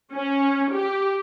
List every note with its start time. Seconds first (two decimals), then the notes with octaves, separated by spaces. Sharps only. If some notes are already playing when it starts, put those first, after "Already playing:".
0.13 C#4
0.72 G4